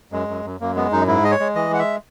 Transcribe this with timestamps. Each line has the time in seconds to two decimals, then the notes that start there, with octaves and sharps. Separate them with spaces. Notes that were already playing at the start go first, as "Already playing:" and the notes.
0.12 F#2 G#3
0.28 F#2
0.45 F#2
0.60 F#2 A#3
0.75 G#3 B3
0.92 F#2 D#4
1.07 G#2 E4
1.23 G#3 D#5
1.31 C#5
1.40 G#3
1.55 E3 D#5
1.70 G#3 F#5
1.79 E5